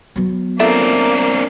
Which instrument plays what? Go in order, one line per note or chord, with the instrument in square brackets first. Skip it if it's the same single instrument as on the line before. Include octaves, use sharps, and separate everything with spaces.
[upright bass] F#3 B3
[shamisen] A3 F4 E5 [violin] A#3 [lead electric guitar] C4 D4